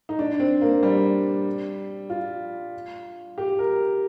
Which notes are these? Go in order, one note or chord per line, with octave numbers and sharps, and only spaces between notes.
D#4
D4
C4
A#3
G3
F4
G4
A#4